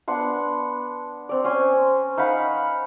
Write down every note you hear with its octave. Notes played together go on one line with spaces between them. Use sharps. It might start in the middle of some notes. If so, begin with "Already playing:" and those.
B3 D4 F#5 C6
C4 D5
C4 C#4 G#5 C6
D#4 F5 F#5 B5